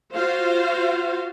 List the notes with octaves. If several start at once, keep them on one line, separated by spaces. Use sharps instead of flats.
F4 F#4 C5 F5